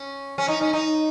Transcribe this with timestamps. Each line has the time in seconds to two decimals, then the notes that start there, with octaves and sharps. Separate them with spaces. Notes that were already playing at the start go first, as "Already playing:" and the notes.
Already playing: C#4
0.38 C#4
0.48 D#4
0.61 C#4
0.73 D#4